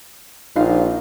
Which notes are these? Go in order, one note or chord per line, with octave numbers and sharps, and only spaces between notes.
A#1 D#4 F4